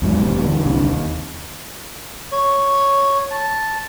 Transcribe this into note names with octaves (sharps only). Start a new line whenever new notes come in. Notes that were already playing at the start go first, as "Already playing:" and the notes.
E2 G#2 F#3
E1 D#2 G3 B3
D3 E3
F#1 C2 C3 D4
D#2
C#5
A5